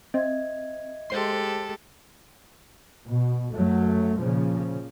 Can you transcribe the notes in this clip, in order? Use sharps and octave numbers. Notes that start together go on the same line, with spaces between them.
C4 D#5 E5 G#6
G#3 G4 A4 C5 C6
B2
F#2 F#3 A3
A#2 C#3 F3